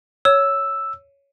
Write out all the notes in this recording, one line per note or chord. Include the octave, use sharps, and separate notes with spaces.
C#5 E6